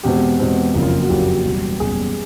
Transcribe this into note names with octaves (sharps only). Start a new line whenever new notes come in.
E2 B2 G#3 C4 G4
E2 B2 G#3 C4
F#1 F2 C#3 F#3 A#3
F4
F#4
F#1 F2 C#3 F#3 A#3 G4
F#1 E2 B2 G3
F#1 E2 B2 G3 G#4